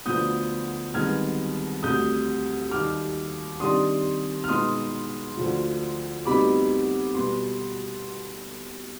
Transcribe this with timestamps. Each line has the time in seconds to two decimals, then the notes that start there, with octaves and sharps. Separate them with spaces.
0.06 D2 D3 F3 B3 D#6 G6
0.94 C2 C3 D#3 G#3 B3 F6 G#6
1.83 D2 C3 G3 D#6 G6
2.71 D#2 D#3 G3 D6 F6
3.60 C3 D#3 G3 D4 C6 D#6
4.44 F6
4.48 B2 G#3 B3 D#4 C6 D#6
5.37 D2 D3 F3
6.25 D2 C3 G3 B3 D#4 B5 D6
7.15 B2 G3 B3 C6